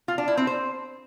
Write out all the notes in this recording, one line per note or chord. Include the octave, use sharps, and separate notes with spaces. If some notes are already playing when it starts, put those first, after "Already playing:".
F4
D4
E4
C4
C5